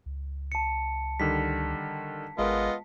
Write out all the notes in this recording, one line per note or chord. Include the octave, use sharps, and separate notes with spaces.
C#2
A5 C#7
D3 D#3 G3 B6
G#1 G#3 B3 F4 A#4 D#5